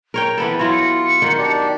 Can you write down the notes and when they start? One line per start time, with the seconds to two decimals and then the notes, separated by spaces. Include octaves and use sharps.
0.14 A#4 C#5 G5
0.38 E3 B3 A4 B5
0.59 F#3 E4 F4 C#5 A#6
0.72 C#7
1.22 D#3 F#4
1.38 D4 G4 D5